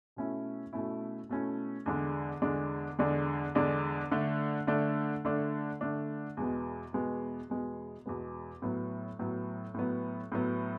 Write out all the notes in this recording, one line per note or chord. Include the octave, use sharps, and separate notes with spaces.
B2 A3 C#4 E4
B2 A3 C#4 E4
B2 A3 C#4 E4
E2 D3 G#3 D4
E2 D3 G#3 D4
E2 D3 G#3 D4
E2 D3 G#3 D4
D3 A3 D4
D3 A3 D4
D3 A3 D4
D3 A3 D4
E2 B2 G#3 B3
E2 B2 G#3 B3
E2 B2 G#3 B3
E2 B2 G#3 B3
A2 F#3 B3
A2 F#3 B3
A2 F#3 B3
A2 F#3 B3